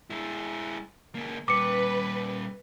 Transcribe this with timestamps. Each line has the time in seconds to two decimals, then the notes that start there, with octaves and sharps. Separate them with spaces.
0.10 G#3 E4
1.15 C#2 A#3
1.48 A#2 G3 B4 D6 C#7